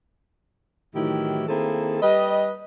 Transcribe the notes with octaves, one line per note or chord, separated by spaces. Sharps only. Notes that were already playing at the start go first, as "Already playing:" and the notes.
A2 D#3 E3 F#3 E4 G4
D#3 A#3 C4 E4 G#4 A4
G3 B4 D#5